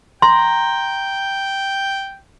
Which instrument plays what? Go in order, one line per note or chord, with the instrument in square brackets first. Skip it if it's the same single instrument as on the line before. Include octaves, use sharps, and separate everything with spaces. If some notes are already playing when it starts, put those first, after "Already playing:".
[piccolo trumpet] G5 [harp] A#5 [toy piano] C6